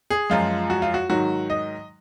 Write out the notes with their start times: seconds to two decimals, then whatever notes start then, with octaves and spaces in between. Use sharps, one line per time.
0.10 G#4
0.30 F#2 F3 G#3 F4
0.70 F#4
0.82 F4
0.94 F#4
1.09 G#2 D#3 F#3 F#4
1.50 D#5